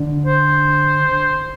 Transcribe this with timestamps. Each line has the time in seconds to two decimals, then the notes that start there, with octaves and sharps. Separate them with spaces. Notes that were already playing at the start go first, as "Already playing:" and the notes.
Already playing: D3
0.26 C5